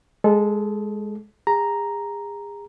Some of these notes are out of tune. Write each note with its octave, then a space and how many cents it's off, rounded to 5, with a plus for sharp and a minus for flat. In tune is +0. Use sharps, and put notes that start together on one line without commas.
G#3 +0 A4 -20
G#4 -35 A#5 +0